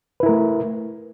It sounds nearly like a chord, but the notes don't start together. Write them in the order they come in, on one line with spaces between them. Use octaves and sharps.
B4 E4 A#4 A3